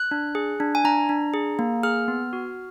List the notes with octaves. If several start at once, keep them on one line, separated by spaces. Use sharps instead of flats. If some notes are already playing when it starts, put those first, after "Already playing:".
Already playing: F#6
D4
G#4
D4
G#5
D4 A#5
D4
G#4
A#3
G#4 F6
B3
F#4